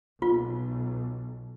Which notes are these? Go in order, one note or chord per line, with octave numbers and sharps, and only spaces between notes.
B1 F4